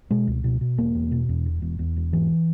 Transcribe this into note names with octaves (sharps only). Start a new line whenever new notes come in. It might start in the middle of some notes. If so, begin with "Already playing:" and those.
B2 G#3
C#2
B2
B2
E1 A#3
E2
B2
E2
E1
E2
E2
E1
G#2 E3